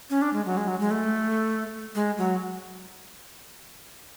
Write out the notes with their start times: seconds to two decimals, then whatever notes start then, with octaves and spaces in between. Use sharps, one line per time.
0.10 C#4
0.22 D4
0.33 G#3
0.46 F#3
0.57 G#3
0.68 F#3
0.80 G#3
0.91 A3
1.95 G#3
2.18 F#3